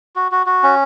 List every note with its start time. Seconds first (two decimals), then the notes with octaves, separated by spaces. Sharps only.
0.16 F#4
0.32 F#4
0.47 F#4
0.63 C#4